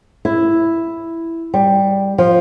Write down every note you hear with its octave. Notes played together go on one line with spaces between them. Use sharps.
E4
G3
F3